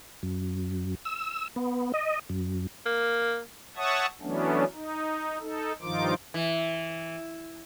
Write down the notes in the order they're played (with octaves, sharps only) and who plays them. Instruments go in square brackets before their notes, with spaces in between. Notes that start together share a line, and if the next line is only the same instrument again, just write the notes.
[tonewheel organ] F#2
E6
B3
D#5
F#2
[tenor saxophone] A#3
[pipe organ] C#5 E5 F#5 A5 C#6 D#6
E3 F#3 A3 B3 C#4 D4
D#4
D#4 A4
G2 D#3 F3 D#4 F4 D6
[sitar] E3